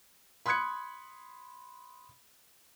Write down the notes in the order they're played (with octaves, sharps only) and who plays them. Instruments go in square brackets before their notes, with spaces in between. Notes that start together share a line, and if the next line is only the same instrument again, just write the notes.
[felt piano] B5 C6 D#6 F#6 G#6 C#7